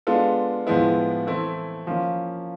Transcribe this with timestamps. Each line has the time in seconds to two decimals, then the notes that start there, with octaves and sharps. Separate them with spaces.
0.07 G#3 B3 D4 F4 A4
0.67 A2 F3 G#3 B3 E4
1.27 E3 A3 C4 E4
1.87 F3 A#3 C#4